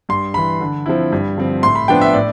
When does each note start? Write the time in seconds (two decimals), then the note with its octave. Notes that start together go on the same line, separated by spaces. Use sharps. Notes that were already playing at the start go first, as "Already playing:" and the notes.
0.09 G2 C6
0.34 E3 G3 B5
0.61 D3
0.86 F3 C4 E4
1.12 G2
1.37 D3 F3 C4
1.63 A2 C6
1.75 B5
1.88 F3 B3 D4 G5
2.01 E5
2.14 A2 D5